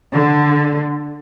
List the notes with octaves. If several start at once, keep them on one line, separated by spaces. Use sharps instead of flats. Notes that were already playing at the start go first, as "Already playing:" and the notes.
D3